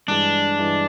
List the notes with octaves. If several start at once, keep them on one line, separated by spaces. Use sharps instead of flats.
G2 E3 G#3 D4
G2 E3 G#3